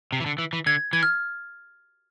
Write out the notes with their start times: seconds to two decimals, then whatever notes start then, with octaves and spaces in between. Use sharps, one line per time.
0.12 C3
0.20 E3
0.26 D3
0.38 E3
0.53 E3
0.66 D3 G#6
0.93 E3 G#6
1.03 F6